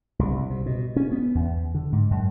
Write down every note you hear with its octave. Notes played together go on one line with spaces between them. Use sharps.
C2
C3
B2
C#4
B3
E2
D3
G#2
F#2